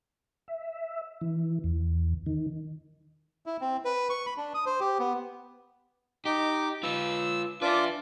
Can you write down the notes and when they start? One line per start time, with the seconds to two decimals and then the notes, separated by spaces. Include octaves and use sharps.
0.48 E5
1.21 E3
1.64 E2
2.26 D#3
3.46 E4
3.61 C4
3.85 B4
4.10 C#6
4.26 B5
4.37 D4
4.54 D#6
4.66 C5
4.80 G4
4.99 B3
6.25 D#4 G4 D6
6.83 F4 B4 E6
7.62 D4 F4 B4 E5 D6